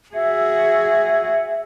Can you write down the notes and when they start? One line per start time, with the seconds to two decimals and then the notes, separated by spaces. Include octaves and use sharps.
0.15 F#4 G#4 E5